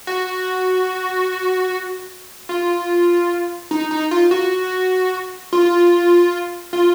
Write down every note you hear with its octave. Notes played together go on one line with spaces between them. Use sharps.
F#4
F4
D#4
D#4
F4
F#4
F4
F4